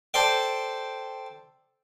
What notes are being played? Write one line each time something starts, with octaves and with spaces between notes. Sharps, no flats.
A4 C5 D5 G5